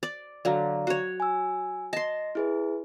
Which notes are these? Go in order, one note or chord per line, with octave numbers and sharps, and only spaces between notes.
D5
D3 F#3 D5 F5 A#5
F#4 C#5
G#5 E6
D#5 A5 C6 A#6
E4 G#4 B4